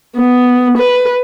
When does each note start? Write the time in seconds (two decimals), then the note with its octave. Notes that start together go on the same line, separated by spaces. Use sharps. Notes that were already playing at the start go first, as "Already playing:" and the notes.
0.17 B3
0.78 B4